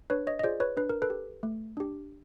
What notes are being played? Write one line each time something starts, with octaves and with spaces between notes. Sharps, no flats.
D4 B4 C#5
C#5 D#5
D#5
F4 G#4 C5 D5
B4 C#5
D4 B4
A#4
A4 B4
G4
A3
D4 G4